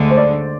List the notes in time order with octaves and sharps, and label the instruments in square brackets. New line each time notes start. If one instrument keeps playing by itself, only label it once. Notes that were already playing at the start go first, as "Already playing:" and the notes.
Already playing: [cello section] D2 D3 G#3
[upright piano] C5
D5